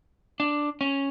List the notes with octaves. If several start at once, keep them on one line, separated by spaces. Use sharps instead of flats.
D4
C#4